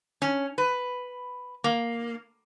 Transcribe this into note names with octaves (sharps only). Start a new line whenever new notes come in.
C#4
B4
A#3